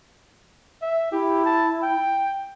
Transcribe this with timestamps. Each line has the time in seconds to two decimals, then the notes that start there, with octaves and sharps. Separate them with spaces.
0.82 E5
1.12 E4 G4
1.45 A5
1.83 G5